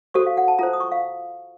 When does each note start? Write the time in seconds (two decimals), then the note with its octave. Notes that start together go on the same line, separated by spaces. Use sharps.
0.14 F#4 A4 C5 C#6
0.26 F5
0.37 F#5
0.48 A5
0.59 F4 A4 C5 A#5
0.73 D#6
0.80 C#6
0.92 F5